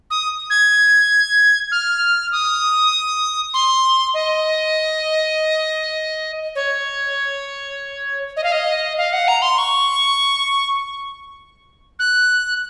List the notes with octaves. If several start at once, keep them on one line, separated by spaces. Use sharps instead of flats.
D#6
G#6
F6
D#6
C6
D#5
C#5
D#5
F5
D#5
F5
F#5
A#5
C6
C#6
F#6